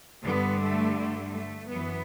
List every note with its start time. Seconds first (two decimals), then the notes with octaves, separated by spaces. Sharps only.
0.24 G2 D3 G3 B3
0.60 A3
0.96 A3
1.33 A3
1.69 F#2 E3 B3